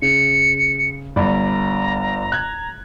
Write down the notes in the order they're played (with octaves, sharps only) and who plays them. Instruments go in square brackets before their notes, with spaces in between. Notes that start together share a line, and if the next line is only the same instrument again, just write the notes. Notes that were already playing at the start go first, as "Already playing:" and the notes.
[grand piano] C#3 [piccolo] C#7
[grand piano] G1 D5 B5 [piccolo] A#5
[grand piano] F#6 G#6